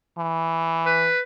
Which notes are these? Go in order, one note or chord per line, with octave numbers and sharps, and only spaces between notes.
E3
B4